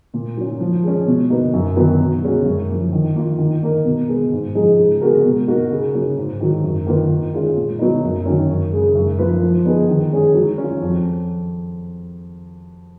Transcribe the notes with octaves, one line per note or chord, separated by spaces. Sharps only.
A#2
F#3 C#4
F3
G#3 C#4
B2
A#3 D#4 F#4 B4
F#2
D#3 F#3 B3
B2
G#3 C#4 F#4
F#2
F3 A#3
D#3
A#3 F4
D#3
A#3 D#4 A#4
B2
G#3 B3
G#2
F3 G#3 D#4 G#4
C#3
G#3 B3 F#4 A#4
B2
A#3 D#4 F#4 A#4
C#3
F#3 A#3 C#4
G#2
D#3 F#3
F#2
D#3 A#3 F4 B4
D#3
G#3 C#4 F4 G#4
A#2
F#3 B3 D#4
F#2
D#3 F#3 A#3 C#4
F#2
C#3 G#3
F#2
F3 A#3 F4 B4
F3
B3 D#4 G#4 B4
D#3
G#3 C#4 G#4
F#3
C#4 F4
F2